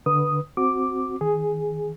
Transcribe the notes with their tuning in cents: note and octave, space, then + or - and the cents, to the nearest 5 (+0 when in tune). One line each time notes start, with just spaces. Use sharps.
D3 +0 B4 -15 D#6 +0
C4 +0 F#4 +0 D6 +0
D#3 +20 G#4 +0